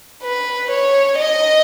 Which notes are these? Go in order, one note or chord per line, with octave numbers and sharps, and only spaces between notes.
B4
C#5
D#5